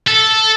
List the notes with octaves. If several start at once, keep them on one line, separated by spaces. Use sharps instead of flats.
A4